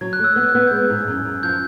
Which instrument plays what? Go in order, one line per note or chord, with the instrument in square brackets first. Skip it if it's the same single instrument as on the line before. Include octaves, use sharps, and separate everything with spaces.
[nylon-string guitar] F#3 [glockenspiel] G#6
[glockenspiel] F#6
[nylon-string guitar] A3 [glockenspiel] E6
[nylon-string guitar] B3 [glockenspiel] F6
[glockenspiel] F#6
[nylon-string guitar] B3
[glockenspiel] F#6
G6
[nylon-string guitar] G#3 [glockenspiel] F#6
[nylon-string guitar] G#2
F#2
F#2
[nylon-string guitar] F3 [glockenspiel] G6